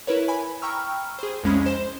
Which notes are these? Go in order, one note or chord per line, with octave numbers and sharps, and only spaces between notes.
E4 A#4 B4 C#5
G#5 B5
G5 A#5 B5 C#6 E6 F6
G#4 C5
C2 F2 G#3 C#4 B5
C5 E7